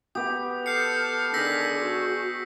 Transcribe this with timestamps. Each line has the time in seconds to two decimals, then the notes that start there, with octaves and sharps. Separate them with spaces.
0.15 B3 G4 D#6
0.66 A4 F6 G6 C7 C#7
1.34 D3 D#3 G#4 E6 A#6 B6
1.81 F#4